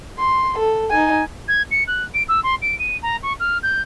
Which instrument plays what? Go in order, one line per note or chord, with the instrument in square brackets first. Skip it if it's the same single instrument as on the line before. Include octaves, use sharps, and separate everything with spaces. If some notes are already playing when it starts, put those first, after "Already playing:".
[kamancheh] C6
A4
D#4 G#5
[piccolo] G#6
C#7
F#6
D7
E6
C6
D7
D#7
A#5
C#6
F6
G6